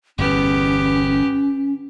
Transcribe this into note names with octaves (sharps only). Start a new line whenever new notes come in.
G1 E2 B3 C#4 G4